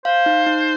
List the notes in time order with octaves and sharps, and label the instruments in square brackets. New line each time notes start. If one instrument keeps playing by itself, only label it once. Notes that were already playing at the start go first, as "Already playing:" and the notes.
[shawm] C5 [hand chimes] F5
[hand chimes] D#4
D#4